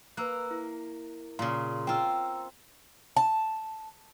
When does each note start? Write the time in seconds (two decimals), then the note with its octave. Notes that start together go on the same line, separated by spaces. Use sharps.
0.17 A#3 B4 E6 F#6
0.51 E4
1.39 A#2 C#3 F5 A#5 C6
1.87 C4 F4 G5 A#5 E6
3.17 A5